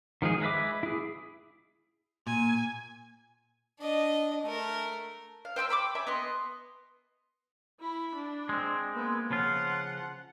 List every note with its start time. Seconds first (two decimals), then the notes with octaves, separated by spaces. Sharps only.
0.22 D#3 F3 G#3 G#4
0.42 G#3 B4 E5 B5 D6
0.83 E4 G#4
2.27 A#2 G#5
3.80 D4 D#5
4.43 A3 A#4
5.45 F5
5.56 C5 G5 B5 E6
5.69 G5 B5 C#6 D6
5.95 E5 G#5 B5
6.07 B3 D#5 C6
7.80 E4 B5
8.15 D4
8.49 G#3 C4
8.93 A#3 B3
9.31 C#3 F3 F4 F#5